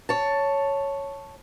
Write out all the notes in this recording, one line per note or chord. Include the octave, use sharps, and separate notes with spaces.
C#5 A5